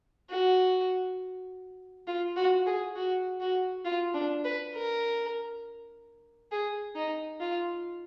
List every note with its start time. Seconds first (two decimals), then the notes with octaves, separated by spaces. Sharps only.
0.30 F#4
2.07 F4
2.36 F#4
2.67 G#4
2.96 F#4
3.40 F#4
3.85 F4
4.14 D4
4.44 B4
4.74 A#4
6.52 G#4
6.95 D#4
7.40 F4